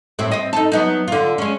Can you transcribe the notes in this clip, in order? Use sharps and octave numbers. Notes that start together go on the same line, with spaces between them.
A2 C4 E4
C4 D#5
D#4 A4
F#3 B3 D#4
D3 F4
G#3 C#4